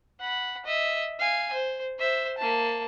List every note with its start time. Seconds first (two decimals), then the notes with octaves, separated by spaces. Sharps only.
0.21 F#5 B5
0.66 D#5 E5
1.19 F5 G#5
1.53 C5
1.99 C5 E5
2.38 A#3 A5